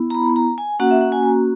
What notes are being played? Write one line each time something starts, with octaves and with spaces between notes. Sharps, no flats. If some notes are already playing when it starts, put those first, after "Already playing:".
Already playing: B3 E4
A#5
B5
A#5
G#5
A#3 C#4 F#4 F#5
E5
F#5
G#5
A#5